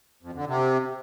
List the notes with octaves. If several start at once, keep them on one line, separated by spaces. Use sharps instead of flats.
F2
D3
C3